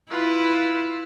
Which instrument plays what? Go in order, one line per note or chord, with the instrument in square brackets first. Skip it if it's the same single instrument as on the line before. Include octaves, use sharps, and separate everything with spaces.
[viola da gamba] E4 [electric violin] F4 B4